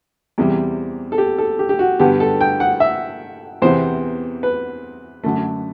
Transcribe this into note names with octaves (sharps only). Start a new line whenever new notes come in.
E2 C3 G3
A4
G4
A4
G4
G4
F#4
G2 D3 G3 B3 G4
A4
G5
F#5
E5
E2 C3 E3 B3 C5
B4
F#2 D3 A3